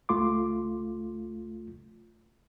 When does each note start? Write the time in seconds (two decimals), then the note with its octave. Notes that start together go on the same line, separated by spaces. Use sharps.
0.09 C#2 A3 F4 C6 D6